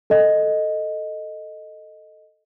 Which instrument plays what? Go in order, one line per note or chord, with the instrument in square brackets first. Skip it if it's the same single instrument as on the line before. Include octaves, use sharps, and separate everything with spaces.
[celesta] A4 D#5